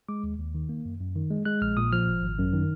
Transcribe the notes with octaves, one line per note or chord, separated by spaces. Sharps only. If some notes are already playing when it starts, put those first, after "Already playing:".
G#3 D6
D#2
D#2
D#3
A#3
F#2
F#2
D#3
G#3
G#3 F#6
A#1 F6
A#2 D#6
F3 F6
G#1
G#1
F#2
D#3